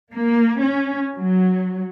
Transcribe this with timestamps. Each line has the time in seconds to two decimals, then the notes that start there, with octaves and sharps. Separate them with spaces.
0.12 A#3
0.59 C#4
1.16 F#3